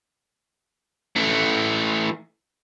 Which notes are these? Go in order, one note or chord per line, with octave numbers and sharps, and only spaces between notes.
E3 A3